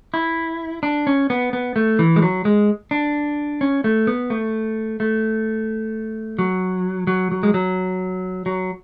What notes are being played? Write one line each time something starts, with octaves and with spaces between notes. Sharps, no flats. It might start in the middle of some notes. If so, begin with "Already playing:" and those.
E4
D4
C#4
B3
B3
A3
E3
G#3
F#3
G#3
D4
C#4
A3
B3
A3
A3
F#3
F#3
F#3
G#3
F#3
F#3